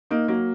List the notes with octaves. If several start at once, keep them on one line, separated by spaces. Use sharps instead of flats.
A#3 D#4
F#3 A#3